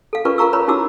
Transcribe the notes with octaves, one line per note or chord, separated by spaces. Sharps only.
A4 F5
C#4 F4 A#4 B4 D5 C#6
F4 A#4 F5 A#5 C#6 E6
B4 C#5 A#5 B5
C#4 D#4 E4 F#4 D6 E6